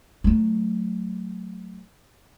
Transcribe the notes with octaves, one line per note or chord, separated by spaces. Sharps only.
F#3 A3